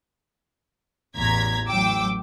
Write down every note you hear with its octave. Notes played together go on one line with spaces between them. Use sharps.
A1 E2 A#5 G#6 B6
A1 F#3 G5 D6 E6